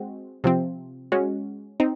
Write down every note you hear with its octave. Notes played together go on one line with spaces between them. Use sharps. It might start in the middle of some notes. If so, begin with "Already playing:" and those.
Already playing: G#3 C4 F#4
C3 F3 C4
G#3 C#4 F#4
C4 D#4